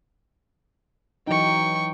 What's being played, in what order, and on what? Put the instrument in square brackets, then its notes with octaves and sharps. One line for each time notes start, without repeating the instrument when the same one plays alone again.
[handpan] E3 F#3 D#4 [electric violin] G5 C#6